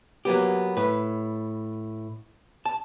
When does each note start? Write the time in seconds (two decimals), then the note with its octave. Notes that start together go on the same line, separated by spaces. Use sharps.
0.25 F#3 A#3 B3 G4
0.77 A2 B4
2.65 A5